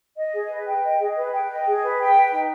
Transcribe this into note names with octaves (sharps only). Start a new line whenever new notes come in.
D#5
G#4
B4
G5
D#5
G#4
B4
G5
D#5
G#4
B4
G5
B4
D#4